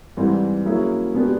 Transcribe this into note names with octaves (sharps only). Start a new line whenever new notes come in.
G#2 E3 G3 C4
F#3 A#3 C#4 E4 G#4
B2 G#3 B3 D4 G4